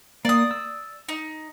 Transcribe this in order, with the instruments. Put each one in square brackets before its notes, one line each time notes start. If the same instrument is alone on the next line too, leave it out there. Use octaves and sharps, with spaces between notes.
[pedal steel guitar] A#3 [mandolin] D5 D#6
[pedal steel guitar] E6
[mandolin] D#4